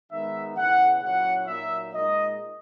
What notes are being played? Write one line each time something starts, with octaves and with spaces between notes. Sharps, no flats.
D#3 G#3 B3 D#4 E5
E2 C#3 E3 F#5
A#2 F#3 C#4 E4 F#5
A#2 F#3 A#3 D#4 E5
A#2 G#3 D#4 D#5